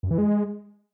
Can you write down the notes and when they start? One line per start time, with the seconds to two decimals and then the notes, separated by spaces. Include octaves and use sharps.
0.03 F#2
0.11 E3
0.18 G#3